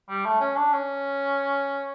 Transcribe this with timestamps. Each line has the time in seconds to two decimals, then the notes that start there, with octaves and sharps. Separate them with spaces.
0.09 G3
0.25 A3
0.40 C#4
0.56 D4
0.73 C#4